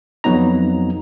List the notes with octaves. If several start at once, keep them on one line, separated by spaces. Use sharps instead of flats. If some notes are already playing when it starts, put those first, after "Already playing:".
F2 F#3 B3 D#4 A#5